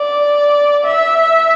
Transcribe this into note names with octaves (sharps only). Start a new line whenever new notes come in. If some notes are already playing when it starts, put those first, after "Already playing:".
Already playing: D5
E5